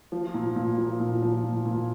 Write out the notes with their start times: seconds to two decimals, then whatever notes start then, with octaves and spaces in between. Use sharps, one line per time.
0.12 F3
0.34 A#2
0.56 A#2
0.78 F3
1.00 A#2
1.22 F3
1.44 A#2
1.66 A#2